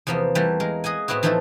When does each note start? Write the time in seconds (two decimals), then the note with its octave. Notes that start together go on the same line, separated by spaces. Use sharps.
0.07 E2 C3 F3 A#3 B3
0.35 E3 G3 A3 A#3
0.60 G#3 A#4
0.84 G#4 D#5 F#5 G#5
1.08 A2 B3 C4 E4 F#4
1.23 E3 F3 A3 D#4 E4 A4